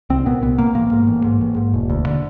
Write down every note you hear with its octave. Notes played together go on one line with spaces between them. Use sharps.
C2 C4
A#2 B3
C2 B3
A#2 A#3
A1 A#3
G#2
A1
G#2
A1
G#2
E1
D2
D3